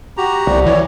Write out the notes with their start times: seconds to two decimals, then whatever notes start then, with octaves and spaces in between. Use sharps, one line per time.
0.17 F#4 G4 A#5
0.47 C2 D5
0.66 E3 C#5